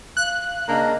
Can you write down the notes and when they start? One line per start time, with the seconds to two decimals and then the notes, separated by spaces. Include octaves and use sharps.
0.17 F5 F#6
0.69 C#3 A#3 D4 D#5